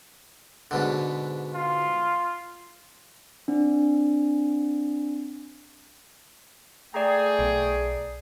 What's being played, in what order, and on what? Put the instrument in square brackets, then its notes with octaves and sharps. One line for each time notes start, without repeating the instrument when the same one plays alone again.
[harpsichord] G#2 B2 D3
[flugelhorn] F4
[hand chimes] C4 D4
[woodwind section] A3 G5 [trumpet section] G#4 [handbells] D5 A#5
[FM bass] B1